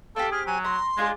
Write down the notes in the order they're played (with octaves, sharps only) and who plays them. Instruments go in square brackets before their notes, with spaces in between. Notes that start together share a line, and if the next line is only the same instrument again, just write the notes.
[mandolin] C4 G4 [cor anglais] A4 [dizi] F5
[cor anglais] G#4 [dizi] F6
[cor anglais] F#3 [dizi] G#5
[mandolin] A#5 [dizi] C6
[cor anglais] G#3 [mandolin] D4 F4 G#4